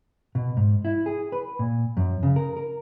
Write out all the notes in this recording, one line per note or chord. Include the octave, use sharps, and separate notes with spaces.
B2
G#2
E4
G#4
B4
A#2
F#2
C#3
A#4
A#4